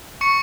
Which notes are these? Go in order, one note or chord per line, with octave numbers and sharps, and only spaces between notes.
C#6 C#7